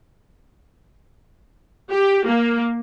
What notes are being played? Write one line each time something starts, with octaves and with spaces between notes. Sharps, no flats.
G4
A#3